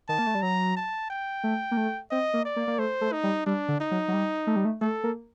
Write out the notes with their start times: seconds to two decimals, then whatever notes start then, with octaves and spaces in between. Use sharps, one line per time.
0.08 D#3 A5
0.19 A#3
0.27 A3
0.35 G3
0.42 F#3 A#5
0.76 A5
1.10 G5
1.44 A3
1.71 A#3
1.77 A3
2.11 C4 D#5
2.34 A#3
2.45 D5
2.56 A#3
2.68 A#3
2.79 A3 C5
3.01 A3
3.12 D#4
3.23 G3
3.46 G3 D4
3.68 D3
3.80 D#4
3.91 F#3
4.08 F#3
4.13 G3
4.47 A3
4.56 G3
4.65 A3
4.81 A3 A4
5.04 A#3